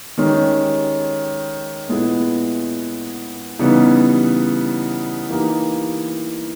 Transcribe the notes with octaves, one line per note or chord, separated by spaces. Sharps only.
D#3 G#3 C#4 G4
A#2 G#3 B3 E4 G#4
C#3 E3 G3 B3 D#4
E3 A#3 D#4 G4